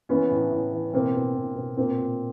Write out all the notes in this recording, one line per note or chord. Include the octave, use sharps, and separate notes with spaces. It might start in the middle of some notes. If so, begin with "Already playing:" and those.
E3 B3 C#4
A2
A2
E3
B2 A#3 C4
B2
B2
B2
A#2 A#3 C4
A#2